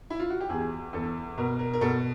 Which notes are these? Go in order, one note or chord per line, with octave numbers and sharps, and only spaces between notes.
E4
F4
F#4
G4
E2 G#4
E2 A4
B2 A#4
A#4
A#4
B2 A4